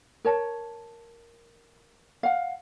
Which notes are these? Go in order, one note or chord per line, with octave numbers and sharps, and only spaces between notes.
A#4 C#5 A5
F5 F#5